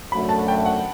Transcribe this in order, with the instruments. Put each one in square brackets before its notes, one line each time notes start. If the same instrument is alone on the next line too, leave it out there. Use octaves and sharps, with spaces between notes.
[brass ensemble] F#2 F#3 A3 D4 F#4 [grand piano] B5
[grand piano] A5
G5
F#5